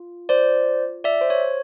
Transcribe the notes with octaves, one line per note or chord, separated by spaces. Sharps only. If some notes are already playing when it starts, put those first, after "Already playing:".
Already playing: F4
C5 D5
D5 E5
C5
C#5